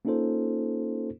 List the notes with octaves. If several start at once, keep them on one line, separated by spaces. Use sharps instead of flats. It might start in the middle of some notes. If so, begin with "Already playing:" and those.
A#3 C#4 D#4 F4 A4 C5